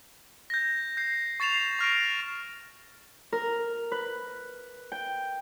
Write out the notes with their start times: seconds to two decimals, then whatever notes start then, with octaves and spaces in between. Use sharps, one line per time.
0.50 G6 A#6
0.97 G6 C7
1.40 C#6 A6 C7 E7 F7
1.79 C#6 F6 A#6 D7
3.33 A#4
3.92 B4
4.92 G5